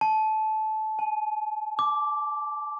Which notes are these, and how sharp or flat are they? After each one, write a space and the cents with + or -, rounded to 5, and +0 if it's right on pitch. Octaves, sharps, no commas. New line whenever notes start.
A5 -20
G#5 +40
D6 -5